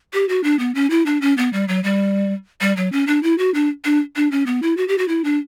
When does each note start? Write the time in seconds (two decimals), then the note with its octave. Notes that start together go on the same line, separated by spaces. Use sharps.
0.13 G4
0.29 F#4
0.44 D4
0.59 B3
0.75 C#4
0.90 E4
1.06 D4
1.22 C#4
1.37 B3
1.53 G3
1.68 F#3
1.84 G3
2.61 G3
2.77 F#3
2.92 C#4
3.07 D4
3.23 E4
3.38 F#4
3.54 D4
3.85 D4
4.16 D4
4.32 C#4
4.46 B3
4.62 E4
4.77 F#4
4.88 G4
4.98 F#4
5.08 E4
5.24 D4